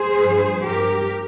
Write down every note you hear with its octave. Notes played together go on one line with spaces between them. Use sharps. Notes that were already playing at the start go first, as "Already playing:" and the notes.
Already playing: G#4 C5
G2 F3
G2 F3 G4 A#4